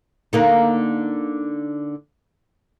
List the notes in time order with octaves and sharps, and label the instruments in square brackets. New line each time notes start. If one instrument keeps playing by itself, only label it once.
[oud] D3 A#3 D#4